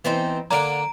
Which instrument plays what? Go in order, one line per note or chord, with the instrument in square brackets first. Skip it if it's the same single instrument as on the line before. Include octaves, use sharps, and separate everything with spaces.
[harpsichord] E3 C5 [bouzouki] B3 C4 D#4
[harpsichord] D3 A#3 D4 [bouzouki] D5 F5 F#5 [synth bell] A#5 D7